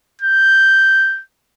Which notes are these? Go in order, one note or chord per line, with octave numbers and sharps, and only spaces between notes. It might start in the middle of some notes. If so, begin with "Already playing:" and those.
G6